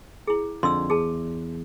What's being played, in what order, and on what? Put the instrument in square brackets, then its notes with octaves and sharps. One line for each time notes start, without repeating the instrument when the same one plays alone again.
[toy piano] E4 G#4
[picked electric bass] F2 D3 [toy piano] C6 E6
[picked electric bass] E2 [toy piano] G#4 A5